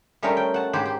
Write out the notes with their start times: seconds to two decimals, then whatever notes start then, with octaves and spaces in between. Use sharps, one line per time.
0.22 G3 A3 C#4 D#4 A#4 C5
0.37 G5
0.54 F#5 A5
0.73 G#2 G4 C5 B5
0.85 G4